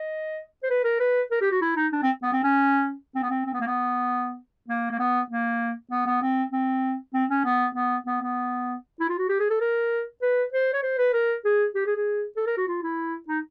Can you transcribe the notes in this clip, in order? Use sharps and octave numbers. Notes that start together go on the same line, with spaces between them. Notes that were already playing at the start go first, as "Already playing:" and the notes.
Already playing: D#5
C5
B4
A#4
B4
A#4
G4
F#4
E4
D#4
D4
C4
B3
C4
C#4
C4
B3
C4
C4
B3
A#3
B3
A#3
A#3
B3
A#3
B3
B3
C4
C4
C4
C#4
B3
B3
B3
B3
E4
F4
F#4
G4
G#4
A4
A#4
B4
C5
C#5
C5
B4
A#4
G#4
G4
G#4
G#4
A4
A#4
F#4
F4
E4
D#4